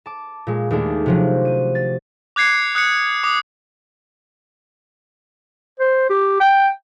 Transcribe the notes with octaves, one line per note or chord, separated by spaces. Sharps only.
A5 D6
A#2 G#3
D#2 G#3 A3 D4
C3 F3 F#3
D#7
A6
D6 F#6 G#6 C7 C#7
D#6 F#6 C7 C#7
D6 D#6
C5
G4
G5